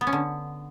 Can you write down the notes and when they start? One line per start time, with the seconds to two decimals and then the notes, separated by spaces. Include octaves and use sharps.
0.01 B3
0.07 C#4
0.13 D3